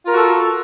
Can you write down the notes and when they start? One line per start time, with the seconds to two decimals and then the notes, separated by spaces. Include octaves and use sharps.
0.04 F4
0.08 A#4
0.12 F#4
0.17 A4